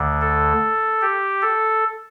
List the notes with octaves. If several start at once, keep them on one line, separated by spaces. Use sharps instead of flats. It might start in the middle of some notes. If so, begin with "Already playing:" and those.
Already playing: D2 D3
A4
G4
A4